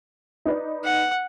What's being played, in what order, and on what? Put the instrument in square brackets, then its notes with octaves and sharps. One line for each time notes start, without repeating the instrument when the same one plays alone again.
[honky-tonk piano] D#4 B4 D5
[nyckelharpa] F#5